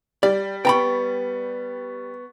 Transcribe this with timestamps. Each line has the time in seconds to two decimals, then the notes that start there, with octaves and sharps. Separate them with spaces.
0.23 G3 D5
0.65 B3 G5 A#5 B5 C#6